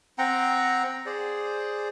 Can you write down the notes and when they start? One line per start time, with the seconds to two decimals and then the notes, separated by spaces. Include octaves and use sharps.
0.18 C4 F#5 G5 A#5
1.06 G#4 C5 D5